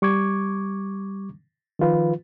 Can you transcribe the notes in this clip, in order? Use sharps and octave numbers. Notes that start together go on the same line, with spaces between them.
G3 C#6 D6 G#6
D#3 F3 F4 B4